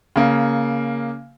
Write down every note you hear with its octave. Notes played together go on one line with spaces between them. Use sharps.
C#3 A#3